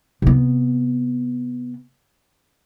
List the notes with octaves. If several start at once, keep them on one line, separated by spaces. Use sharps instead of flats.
C3 B3